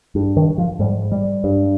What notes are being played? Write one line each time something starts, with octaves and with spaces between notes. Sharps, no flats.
G2
D#3
F3
G#2 G3
G3
G2